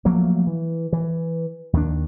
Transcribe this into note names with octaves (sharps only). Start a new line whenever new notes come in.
F3 F#3 A3 A#3
E3
E3
D#2 D#3 E3 D4